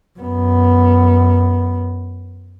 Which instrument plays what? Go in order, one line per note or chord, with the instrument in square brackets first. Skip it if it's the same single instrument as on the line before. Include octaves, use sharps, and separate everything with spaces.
[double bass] F#2 B3